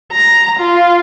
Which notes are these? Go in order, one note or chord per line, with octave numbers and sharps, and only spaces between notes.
A#5
F4